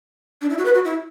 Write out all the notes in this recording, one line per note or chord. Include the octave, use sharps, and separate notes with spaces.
D4
E4
F#4
B4
F#4
E4